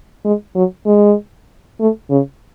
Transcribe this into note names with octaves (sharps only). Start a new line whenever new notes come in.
G#3
F#3
G#3
A3
C#3